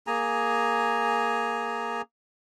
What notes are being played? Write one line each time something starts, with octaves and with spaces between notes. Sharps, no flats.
A#3 G#4 G#5 A#5